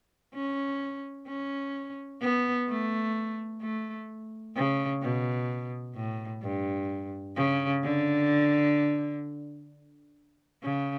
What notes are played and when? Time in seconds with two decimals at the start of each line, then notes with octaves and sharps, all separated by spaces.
0.34 C#4
1.28 C#4
2.21 B3
2.68 A3
3.61 A3
4.55 C#3
5.02 B2
5.95 A2
6.42 G2
7.36 C#3
7.83 D3
10.63 C#3